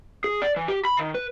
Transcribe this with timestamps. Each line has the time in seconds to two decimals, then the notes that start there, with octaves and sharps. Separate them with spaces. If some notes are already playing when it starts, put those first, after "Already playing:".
0.24 G#4
0.42 D5
0.56 E3
0.68 G4
0.85 B5
0.97 D#3
1.15 B4